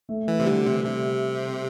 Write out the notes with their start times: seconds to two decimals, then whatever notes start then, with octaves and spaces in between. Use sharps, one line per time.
0.09 A3
0.28 E3
0.39 C3
0.46 D3 G3
0.65 C3
0.85 C3